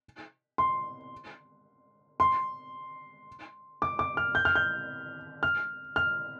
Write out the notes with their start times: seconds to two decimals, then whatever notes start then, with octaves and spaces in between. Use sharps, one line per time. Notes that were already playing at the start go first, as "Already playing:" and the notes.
0.58 C6
2.20 C6
3.82 D6
3.99 D6
4.17 F6
4.35 G6
4.45 F6
4.55 G6
5.43 F6
5.96 F6